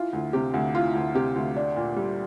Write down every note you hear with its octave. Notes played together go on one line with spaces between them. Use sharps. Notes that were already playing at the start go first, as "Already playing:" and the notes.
Already playing: E3 F4
D2
C3 G4
D2
E3 F4
D2
C3 G4
D2
D4
A#2
G3